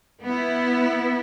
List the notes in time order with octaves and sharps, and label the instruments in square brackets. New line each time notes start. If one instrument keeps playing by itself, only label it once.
[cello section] B3 E4